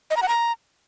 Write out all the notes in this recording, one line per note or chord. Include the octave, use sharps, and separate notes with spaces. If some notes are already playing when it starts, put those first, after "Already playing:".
D#5
A#5
F#5
A#5